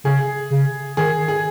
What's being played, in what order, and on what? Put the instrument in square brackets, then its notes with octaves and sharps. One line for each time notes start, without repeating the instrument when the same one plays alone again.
[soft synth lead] C#3 [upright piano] G#4
[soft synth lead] C#3
[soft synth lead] D#3 [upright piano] G#4
[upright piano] G#4